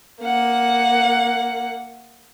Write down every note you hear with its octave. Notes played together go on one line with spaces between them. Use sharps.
A#3 F#5